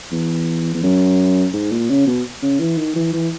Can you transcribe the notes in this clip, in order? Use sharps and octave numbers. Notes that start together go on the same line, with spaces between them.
E2
E2
F#2
G#2
A#2
C#3
B2
C#3
E3
D#3
E3
E3